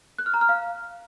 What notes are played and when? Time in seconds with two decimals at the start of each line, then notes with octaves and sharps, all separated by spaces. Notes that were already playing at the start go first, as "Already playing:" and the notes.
0.18 F#6
0.26 F6
0.34 A#5
0.41 F6
0.49 F5